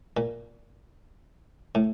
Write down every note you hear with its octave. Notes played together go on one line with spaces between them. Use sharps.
A#2
A2